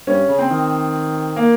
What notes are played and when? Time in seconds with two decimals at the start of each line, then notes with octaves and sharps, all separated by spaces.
0.07 G2 C#4
0.29 C#3
0.39 C4
0.50 D#3
1.36 A#3